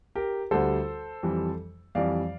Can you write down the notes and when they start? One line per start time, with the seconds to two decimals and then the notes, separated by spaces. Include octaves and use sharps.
0.15 G4 A#4
0.51 D2 D3 G3 A4 C5
1.23 F2 E3 G3
1.95 F2 E3 G3 D5 F5